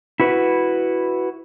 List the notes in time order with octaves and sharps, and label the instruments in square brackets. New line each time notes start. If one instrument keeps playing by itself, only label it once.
[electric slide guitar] E4 F#4 B4